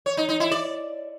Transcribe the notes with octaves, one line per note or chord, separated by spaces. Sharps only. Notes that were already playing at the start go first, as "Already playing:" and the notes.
C#5
D#4
D#4
E4
D5